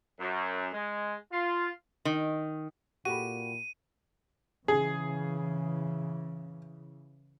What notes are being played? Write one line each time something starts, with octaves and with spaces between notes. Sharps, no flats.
F#2
G#3
F4
D#3
A#2 F#4 G4 A4 B5 D#7
C#3 E3 G#4